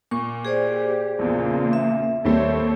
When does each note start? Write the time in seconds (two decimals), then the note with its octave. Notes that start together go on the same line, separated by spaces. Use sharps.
0.11 A#2 C#6
0.45 G4 G#4 C5 D5
1.19 A#1 E2 C#3 A#3 F4
1.73 E5
2.25 D#2 G3 A3 C4 A4 C#5